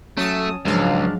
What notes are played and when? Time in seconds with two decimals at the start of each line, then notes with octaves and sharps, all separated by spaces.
0.17 F#3 A3 C#4 A5 D#6
0.65 C#2 G#2 F3 F#3 G#3 D4 F5